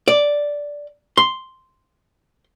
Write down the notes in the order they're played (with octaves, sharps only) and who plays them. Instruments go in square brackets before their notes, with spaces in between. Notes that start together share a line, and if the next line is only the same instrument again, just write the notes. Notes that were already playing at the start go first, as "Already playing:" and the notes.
[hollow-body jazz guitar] D5
C6